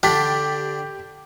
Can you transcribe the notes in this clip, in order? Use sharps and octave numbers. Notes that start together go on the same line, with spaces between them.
D3 D4 G4 A6 B6